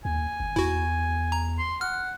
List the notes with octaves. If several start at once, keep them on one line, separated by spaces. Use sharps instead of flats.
D#2 G#5
G1
E2 E4 F#4
A#5
C6
F#5 F6